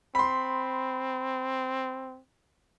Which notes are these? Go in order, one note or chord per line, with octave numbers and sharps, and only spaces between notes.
C4 B5 C6